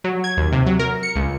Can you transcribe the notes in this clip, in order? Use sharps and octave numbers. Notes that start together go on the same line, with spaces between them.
F#3
G#6
D#2
C3
F#3
A#4
C#7
C#2